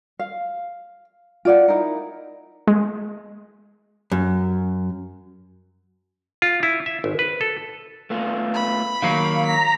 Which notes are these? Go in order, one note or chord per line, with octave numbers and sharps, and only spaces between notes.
F5
F4 D5 F#5
D#4 E4 A#4
G#3
F#2
F4
E4
E5
G#1
B4
A4
A3 B3 F4
B5
D#3 F#3 A#3 F5
A#5 B6